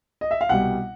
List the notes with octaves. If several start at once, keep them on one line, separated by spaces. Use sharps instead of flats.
D#5
E5
F5
C2 B2 G3 F#5